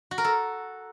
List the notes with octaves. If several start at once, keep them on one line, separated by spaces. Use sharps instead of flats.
F#4
A#4
A4